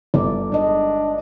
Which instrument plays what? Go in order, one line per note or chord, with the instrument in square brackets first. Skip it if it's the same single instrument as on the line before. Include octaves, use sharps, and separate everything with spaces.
[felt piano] G1 [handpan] D5
[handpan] G#3 D#5 [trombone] D4